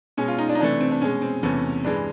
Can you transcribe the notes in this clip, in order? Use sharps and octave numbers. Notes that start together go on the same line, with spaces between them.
B2 G#3 C#4
F4
D#4
D4
D#4
C3 E3 A3 D4
C4
D4
B2 G#3 C#4
C4
E2 C3 E3 A3 C#4
G2 E3 G#3 D4